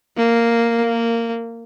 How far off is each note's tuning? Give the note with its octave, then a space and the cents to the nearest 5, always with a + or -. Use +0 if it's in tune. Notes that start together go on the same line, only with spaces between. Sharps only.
A#3 -5
A#3 -15